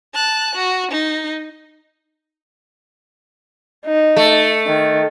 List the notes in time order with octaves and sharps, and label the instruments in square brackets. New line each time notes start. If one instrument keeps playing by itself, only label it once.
[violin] A5 F#6
F#4
D#4
[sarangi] D#4
[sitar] A3
[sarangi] D#3